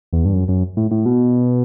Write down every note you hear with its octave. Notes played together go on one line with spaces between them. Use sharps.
E2
G2
F#2
F#2
A2
A2
B2